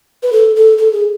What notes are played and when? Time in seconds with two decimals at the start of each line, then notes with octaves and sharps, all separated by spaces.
0.23 B4
0.32 A4
0.56 A4
0.78 A4
0.93 G#4